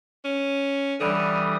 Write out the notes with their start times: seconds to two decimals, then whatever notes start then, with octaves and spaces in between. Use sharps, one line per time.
0.25 C#4
1.00 D3 E3 G3 D#6